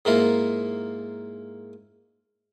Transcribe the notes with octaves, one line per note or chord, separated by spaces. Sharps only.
G#2 A#3 E4 F4